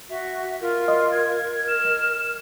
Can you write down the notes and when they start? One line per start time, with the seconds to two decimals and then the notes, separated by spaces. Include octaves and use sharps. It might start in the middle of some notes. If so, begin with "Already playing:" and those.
0.09 F#4 E5
0.61 F4 A#4
0.88 D#5 C6
1.12 G#6
1.68 F6 E7